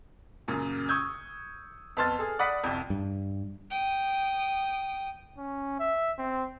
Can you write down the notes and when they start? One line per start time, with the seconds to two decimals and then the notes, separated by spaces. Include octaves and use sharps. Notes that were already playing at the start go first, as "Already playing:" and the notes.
0.48 F#2 A#2 C#3
0.89 C#6 D#6 E6 G6 G#6
1.97 F2 B3 A5 C6 F6 A6
2.19 G#4 A4
2.39 D5 F#5 B5 D#6 B6
2.64 C2 F2
2.90 G2
3.70 G5 D#6
5.38 C#4
5.80 E5
6.18 C4